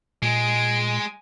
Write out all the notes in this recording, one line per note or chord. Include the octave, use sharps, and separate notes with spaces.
A#2 G#3 G#5 D7